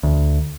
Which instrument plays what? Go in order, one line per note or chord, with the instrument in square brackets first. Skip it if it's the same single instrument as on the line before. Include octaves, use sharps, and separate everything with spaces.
[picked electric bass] D2